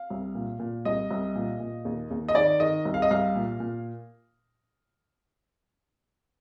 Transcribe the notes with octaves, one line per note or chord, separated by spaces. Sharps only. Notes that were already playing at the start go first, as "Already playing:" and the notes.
Already playing: F5
C2
A#2
A#2
C2 D#5
C2
A#2
A#2
D#2
D#2
D#5
D#3 D5
D#3 D#5
C2
F5
D#5
C2 F5
A#2
A#2